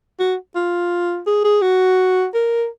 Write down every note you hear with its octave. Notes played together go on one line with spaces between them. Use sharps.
F#4
F4
G#4
G#4
F#4
A#4